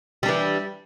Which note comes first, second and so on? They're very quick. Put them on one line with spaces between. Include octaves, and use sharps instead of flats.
G3 D4 E3